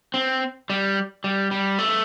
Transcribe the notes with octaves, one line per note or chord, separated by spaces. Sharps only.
C4
G3
G3
G3
A3